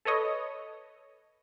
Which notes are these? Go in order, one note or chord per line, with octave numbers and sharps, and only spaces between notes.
A4 B4 C#5 D#5